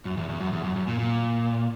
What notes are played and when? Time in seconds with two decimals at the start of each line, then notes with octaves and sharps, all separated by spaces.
0.05 F#2
0.17 E2
0.29 E2
0.40 F#2
0.53 E2
0.64 F#2
0.76 F#2
0.87 A#2
0.99 A#2